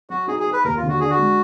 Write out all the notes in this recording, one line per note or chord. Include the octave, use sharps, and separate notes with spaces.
F#3 F#4
D#4 G#4
G#4
B3
B4
D#2 A#4
F4
D3
F#4
D4 G#4
F#4
G#3